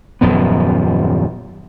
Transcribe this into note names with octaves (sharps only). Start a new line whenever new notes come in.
D#1 F#2 F3 B3